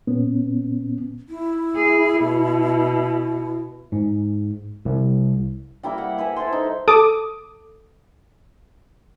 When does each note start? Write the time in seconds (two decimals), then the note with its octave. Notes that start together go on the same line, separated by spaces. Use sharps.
0.07 A#2 B3 C#4
1.29 E4
1.76 G#4
2.21 B2
3.92 G#2
4.85 C2
5.83 G3 A#3 E4 G5
5.98 F#5
6.18 E4 B4 E5 G#5
6.36 E4 A4 C5 C6
6.53 D#4
6.88 A4 D6 D#6